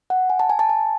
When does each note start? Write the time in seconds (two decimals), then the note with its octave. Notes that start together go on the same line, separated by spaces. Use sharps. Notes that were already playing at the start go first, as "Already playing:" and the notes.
0.10 F#5
0.30 G#5
0.40 A5
0.50 G#5
0.59 A5
0.69 G#5